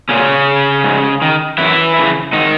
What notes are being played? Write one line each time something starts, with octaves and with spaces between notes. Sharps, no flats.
A#2 C#3 C#4
G#2
D#3
F#2 E3 E4
C#3 E3
G#2 D#3 D#4